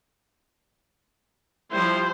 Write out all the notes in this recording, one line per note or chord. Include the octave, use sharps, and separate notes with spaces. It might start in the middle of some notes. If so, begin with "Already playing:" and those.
F3 G3 E4 C5